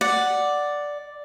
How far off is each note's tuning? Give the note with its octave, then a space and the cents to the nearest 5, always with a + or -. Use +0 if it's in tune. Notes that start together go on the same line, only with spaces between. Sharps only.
D5 +0 F#5 +0